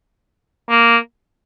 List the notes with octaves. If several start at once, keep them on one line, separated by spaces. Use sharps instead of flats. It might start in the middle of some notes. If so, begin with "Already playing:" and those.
A#3